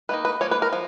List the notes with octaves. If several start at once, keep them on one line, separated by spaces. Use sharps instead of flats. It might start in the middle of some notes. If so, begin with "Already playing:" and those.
D#3 A#3 D#4 B4
B4
F3 A#3 C#5
B4
A#4
F3